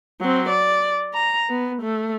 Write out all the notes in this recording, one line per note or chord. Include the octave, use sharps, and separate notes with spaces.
F#3 C4
D5
A#5
B3
A3